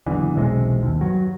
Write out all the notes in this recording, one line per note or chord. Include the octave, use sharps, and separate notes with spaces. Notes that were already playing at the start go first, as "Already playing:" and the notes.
F#1 E2 D3 E3
E1 B1 C3 G#3
D#2
G2 F#3